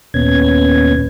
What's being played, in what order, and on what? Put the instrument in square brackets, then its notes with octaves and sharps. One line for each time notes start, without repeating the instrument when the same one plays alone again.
[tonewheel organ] D#2 A#2 B3 C#4 G#6